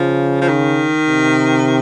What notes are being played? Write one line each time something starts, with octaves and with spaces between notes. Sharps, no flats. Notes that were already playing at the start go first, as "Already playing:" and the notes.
Already playing: C#3 F3
F3
D#3
C3